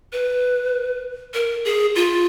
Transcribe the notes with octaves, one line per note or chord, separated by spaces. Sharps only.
B4
A#4
G#4
F4